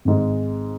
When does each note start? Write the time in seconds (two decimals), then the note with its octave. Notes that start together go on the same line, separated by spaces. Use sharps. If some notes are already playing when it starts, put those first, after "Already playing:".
0.05 G#1 G#2 G#3